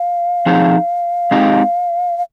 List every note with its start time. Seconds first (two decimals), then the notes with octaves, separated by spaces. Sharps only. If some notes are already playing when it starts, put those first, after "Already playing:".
Already playing: F5
0.46 F3 C4 D#4 G#4
1.31 G#3 C4 D#4 G4
2.17 F5